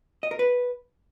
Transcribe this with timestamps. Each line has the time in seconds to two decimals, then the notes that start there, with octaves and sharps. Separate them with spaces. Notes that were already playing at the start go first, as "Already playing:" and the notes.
0.23 D#5
0.31 A#4
0.39 B4